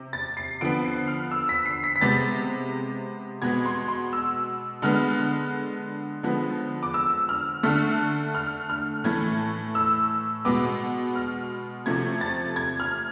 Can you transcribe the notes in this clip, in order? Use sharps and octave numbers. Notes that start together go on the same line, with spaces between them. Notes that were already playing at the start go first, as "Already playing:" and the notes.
Already playing: C3
A6
C7
D3 F3 B3 D7
C7
F6
E6
B6
C7
B6
B6
C3 G#3 B3 A6
B2 G#3 B3 G#6
C6
C6
E6
D3 G#3 B3 F6
D3 F3 G#3 B3
D6
E6
F6
D3 A3 F6
F6
F6
A2 E3 A3 G#6
E6
B2 G#3 B3 D6
F6
C3 F3 A3 G#6
A6
G#6
F6